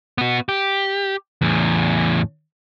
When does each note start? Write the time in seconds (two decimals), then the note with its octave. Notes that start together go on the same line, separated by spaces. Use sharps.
0.18 B3 F#4
0.49 G4
1.41 E2 A2